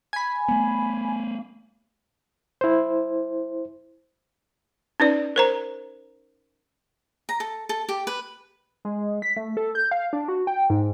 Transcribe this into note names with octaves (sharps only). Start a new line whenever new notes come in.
G#5 B5
A3 B3
E4 C5
C#4 D#4 B4 D5
A#4 C5 A#5
A#5
A4
A4
G4
B4
G#3
B6
A3
A4
G6
F5
D4
F#4
G5
G#2